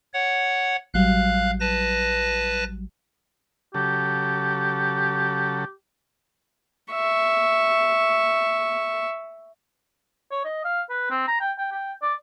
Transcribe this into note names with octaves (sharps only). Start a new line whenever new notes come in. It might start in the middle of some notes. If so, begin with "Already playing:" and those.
C#5 F#5
A1 F#3 G3 F5 F#6
B4 A5 A#6
C#3 F#3 G4 A4
E5 C#6
C#5
D#5
F5
B4
C4
A#5
G5
G5
G5
D5